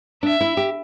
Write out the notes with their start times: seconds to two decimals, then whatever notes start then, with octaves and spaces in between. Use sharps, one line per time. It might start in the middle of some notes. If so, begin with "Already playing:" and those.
0.23 D4 E5
0.41 E4
0.57 G4